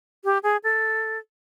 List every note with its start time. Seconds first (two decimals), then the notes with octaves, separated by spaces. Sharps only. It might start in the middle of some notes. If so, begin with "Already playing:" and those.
0.25 G4
0.43 G#4
0.64 A4